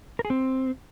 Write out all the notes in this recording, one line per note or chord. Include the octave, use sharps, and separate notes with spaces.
A#4
G#4
C4